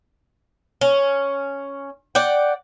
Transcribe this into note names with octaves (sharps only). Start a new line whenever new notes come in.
C#4
D5 F#5 G5